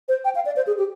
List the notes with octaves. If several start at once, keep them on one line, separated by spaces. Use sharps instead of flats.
C5
G5
F5
D5
C5
G#4
G4